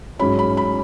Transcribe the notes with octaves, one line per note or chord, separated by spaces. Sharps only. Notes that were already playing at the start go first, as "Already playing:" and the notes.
G#2 F#3 C#4 B5
B5
B5